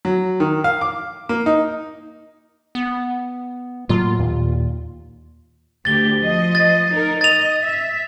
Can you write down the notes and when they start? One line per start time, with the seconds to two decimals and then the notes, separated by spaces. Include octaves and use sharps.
0.05 F#3
0.40 D#3
0.64 F5
0.81 D6
1.29 A#3
1.46 D#4
2.75 B3
3.89 A2 F#3 A#3 F4
4.19 D#2 A#2
5.85 D2 G4 A6 G7
6.20 F3 D#5
6.55 A6
6.91 D#4 A#4
7.21 D#5 A6 F7
7.64 E5